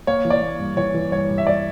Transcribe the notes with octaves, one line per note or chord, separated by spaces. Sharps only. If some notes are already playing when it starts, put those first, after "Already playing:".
A#3 C#5
E3
D5
A#3
G2
E3 C#5
E3
G2 C#5
G2
E5
G2 D5